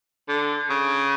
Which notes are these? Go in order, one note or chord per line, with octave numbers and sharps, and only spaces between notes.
D3
C#3